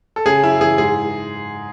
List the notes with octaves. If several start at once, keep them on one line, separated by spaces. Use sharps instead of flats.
A4
C#3 G#4
F#2 E4
E3 G#4
G#2 G#4